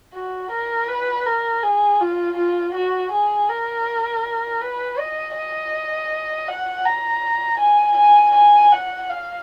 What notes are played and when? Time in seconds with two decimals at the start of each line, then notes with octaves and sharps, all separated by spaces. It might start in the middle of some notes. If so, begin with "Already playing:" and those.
0.13 F#4
0.51 A#4
0.88 B4
1.26 A#4
1.63 G#4
2.00 F4
2.37 F4
2.75 F#4
3.12 G#4
3.50 A#4
4.62 B4
4.99 D#5
5.36 D#5
6.48 F#5
6.86 A#5
7.60 G#5
7.97 G#5
8.35 G#5
8.72 F#5
9.09 F5